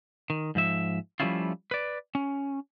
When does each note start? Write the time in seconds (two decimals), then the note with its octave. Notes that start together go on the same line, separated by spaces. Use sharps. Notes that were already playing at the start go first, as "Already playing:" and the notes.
0.30 D#3
0.55 G#2 F3 E5
1.20 F3 G3 A3 C#4 E4 F4
1.71 B4 D5
2.15 C#4